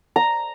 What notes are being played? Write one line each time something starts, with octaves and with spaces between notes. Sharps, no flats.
A#5